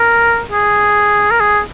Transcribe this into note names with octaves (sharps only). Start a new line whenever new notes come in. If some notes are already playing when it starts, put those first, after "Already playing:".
Already playing: A#4
G#4
A#4
G#4